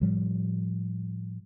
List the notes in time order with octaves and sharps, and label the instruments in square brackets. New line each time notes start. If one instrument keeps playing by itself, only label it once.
[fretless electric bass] A2 F3 G3